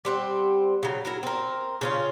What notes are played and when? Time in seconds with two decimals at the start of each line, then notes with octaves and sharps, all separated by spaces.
0.05 G3 C4 F#5
0.83 C#3 F#3
1.05 F#3 E4 A#4
1.23 C4 A#4
1.81 C#3 C#4 F4